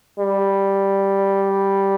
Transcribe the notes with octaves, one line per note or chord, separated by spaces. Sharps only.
G3